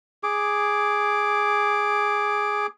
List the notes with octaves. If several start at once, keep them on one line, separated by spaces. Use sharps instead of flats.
G#4 D6